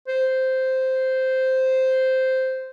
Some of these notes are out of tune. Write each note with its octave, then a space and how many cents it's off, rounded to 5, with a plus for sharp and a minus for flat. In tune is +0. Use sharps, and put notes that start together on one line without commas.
C5 -5